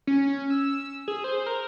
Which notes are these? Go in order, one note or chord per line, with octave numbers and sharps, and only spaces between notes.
C#4
E6
G#4
C5
A#4